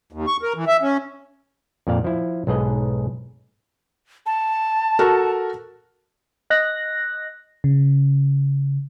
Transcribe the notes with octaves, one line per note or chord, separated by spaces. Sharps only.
D#2
C#6
A#4
E3
E5
C#4
F2 A#2 D5 F5
F3 E4
B1 G#2 G#4 B4 D#5
A5
F#4 A4 A#4
D#5 F#6 A#6
C#3